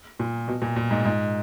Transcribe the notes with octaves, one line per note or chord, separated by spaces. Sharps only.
A#2
B2
A#2
A#2
G#2
G#2